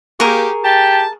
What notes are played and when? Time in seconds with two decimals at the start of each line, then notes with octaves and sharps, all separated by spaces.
0.20 A#3 G4 G#4 A#4 C#6
0.64 G4 A5